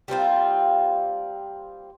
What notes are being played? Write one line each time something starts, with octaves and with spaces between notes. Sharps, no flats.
G3 A#3 C4 F4